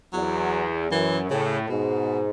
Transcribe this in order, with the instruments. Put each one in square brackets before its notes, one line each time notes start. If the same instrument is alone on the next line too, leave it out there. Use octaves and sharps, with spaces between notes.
[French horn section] E2 [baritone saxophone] F#3
[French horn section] F#2 [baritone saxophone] E3
[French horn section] A2 [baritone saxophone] C#3
[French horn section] G#2 [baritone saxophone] B2